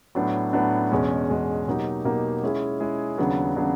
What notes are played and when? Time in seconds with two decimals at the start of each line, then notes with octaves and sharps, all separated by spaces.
0.15 A2 F#3 B3 D4
0.53 A2 F#3 B3 D4
0.91 E2 B2 G#3 C#4
1.29 E2 B2 G#3 C#4
1.67 B2 F#3 A#3 D#4 G4
2.04 B2 F#3 A#3 D#4 G4
2.43 G#3 C#4 E4 G#4
2.80 G#3 C#4 E4 G#4
3.18 D#2 C#3 F#3 B3 D4
3.56 C#3 F#3 B3 D4